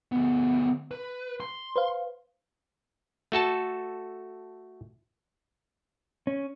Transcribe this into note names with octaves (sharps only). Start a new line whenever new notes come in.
D2 B3
B4
C6
B4 C5 F5
A3 F#4 A4 A5
C#4